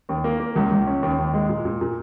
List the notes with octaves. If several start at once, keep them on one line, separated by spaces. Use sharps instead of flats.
D#2
A#3
A#3
C#2
C#2
C#4
D#2
D#2
G#3
A#2
A#2
A#2